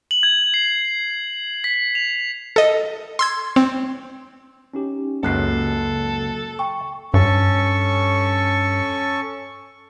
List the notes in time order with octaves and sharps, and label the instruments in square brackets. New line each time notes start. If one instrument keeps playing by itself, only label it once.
[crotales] F#7
G#6
C7
B6
F7
[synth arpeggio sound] A4 D#5
C6 E6 G#6
C4
[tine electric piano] C#4 D#4 G4
[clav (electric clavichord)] C#2 F#2 [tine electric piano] C#3 F#3 [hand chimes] A#3 F#6 C7 [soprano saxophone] A4
[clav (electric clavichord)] G5 [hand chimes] C#6
[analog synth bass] G2 [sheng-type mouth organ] C#4 A4 C#6